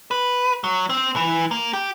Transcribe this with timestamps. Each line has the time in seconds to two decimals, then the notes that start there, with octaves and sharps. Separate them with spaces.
0.11 B4
0.64 F#3
0.90 C4
1.16 E3
1.51 A#3
1.73 G4